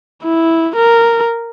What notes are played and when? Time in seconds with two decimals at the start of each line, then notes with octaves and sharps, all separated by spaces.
0.24 E4
0.76 A#4